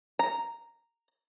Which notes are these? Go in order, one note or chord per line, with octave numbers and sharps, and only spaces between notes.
A#5